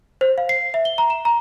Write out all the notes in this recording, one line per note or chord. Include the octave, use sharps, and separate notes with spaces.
C5
F5
C7
E5
G7
A#5
E7
A#5